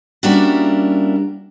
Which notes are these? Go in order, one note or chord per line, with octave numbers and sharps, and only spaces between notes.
G3 A#3 C#4 D4 E4 F#4